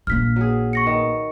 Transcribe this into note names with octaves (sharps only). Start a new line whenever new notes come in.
A#1 A#3 F6 B6
F#3 G#4
C#6 A#6 C#7
D#3